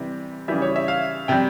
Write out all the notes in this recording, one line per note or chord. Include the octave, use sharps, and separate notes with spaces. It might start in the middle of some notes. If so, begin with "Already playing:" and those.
Already playing: C3 E3 G3
C#3 E3 G3 E5
C#5
E5
F5
C3 G3 G5